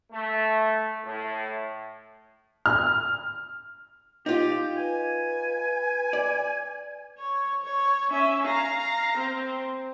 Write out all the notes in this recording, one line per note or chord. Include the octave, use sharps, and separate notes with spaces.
A3
A2
F6
D#4 F4 G4
B4 G#5
D5
C#5
C#5
C#4 E5
F5 A#5
C4